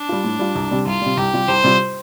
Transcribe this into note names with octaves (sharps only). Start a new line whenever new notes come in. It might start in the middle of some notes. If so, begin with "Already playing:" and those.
Already playing: D4
G3 F4
A2
G3 F4
C2
C3 G3
C2 F4
C3 G3
C2 G4
C3 G3 F4
C2 C5
C3 G3 F4